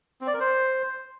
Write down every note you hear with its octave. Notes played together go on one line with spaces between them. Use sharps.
C4
D5
A#4
C5